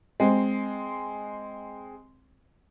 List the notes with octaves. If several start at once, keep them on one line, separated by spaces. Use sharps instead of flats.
G#3 C4